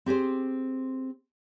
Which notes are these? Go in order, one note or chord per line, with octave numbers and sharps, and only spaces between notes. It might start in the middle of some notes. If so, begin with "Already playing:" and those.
C4 G4 G#4 C5